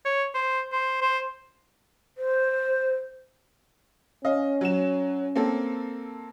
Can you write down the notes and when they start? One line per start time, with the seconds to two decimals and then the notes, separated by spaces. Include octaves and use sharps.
0.05 C#5
0.34 C5
0.72 C5
1.02 C5
2.18 C5
4.25 C#4 D#5 F5
4.61 F#3 F#4 E7
5.36 A#3 C4 A4